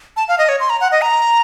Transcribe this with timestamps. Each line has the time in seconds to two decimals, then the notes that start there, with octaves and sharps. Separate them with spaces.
0.17 A5
0.28 F5
0.38 D#5
0.49 C#5
0.60 C6
0.70 A#5
0.81 F#5
0.92 D#5
1.02 A#5